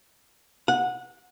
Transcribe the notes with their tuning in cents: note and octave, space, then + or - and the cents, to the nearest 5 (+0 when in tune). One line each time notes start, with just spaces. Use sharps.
F#5 -20